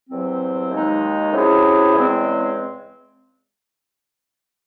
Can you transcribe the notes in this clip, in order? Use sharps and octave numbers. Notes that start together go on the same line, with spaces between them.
E2 C3 F#3 C4
D#2 D#3 G#3 D#4
C3 F#3 C#4 E4 G#4
E2 C#3 G#3 C4